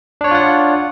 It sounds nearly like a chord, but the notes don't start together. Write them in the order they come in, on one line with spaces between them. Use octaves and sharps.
D4 C#5 D5 F4 F#5